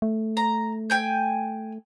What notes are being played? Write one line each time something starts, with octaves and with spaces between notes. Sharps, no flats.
A3
A#5
G5 G#5 G6